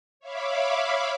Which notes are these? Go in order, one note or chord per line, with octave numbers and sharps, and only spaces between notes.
C#5 E5 F5 B5 D6